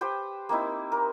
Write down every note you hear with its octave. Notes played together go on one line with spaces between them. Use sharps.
G4 B4 C5 G5
A#3 C4 D#4 E4
A#4